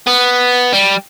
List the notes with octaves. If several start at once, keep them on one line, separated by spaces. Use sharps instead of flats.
B3
G3